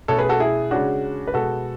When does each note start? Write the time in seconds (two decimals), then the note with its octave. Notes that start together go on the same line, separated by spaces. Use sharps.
0.08 B2 A3 C#4 A4 C#5
0.19 G#4 B4
0.29 F#4 A4
0.40 E4 G#4
0.71 C#3 G#3 C#4 D4 F#4
1.27 B4
1.34 B2 G#3 B3 F#4 A4